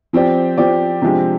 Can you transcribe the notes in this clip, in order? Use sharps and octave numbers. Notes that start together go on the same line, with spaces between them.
F3 C4 G4 D5
F3 C4 G4 D5
C3 F3 G#3 D4 G4